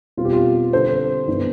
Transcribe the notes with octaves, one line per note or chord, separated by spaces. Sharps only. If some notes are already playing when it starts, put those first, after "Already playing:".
B2 G3 C4 F4
G4
F4
D3 G3 C4 A4 C5
G2 E3 B3 D4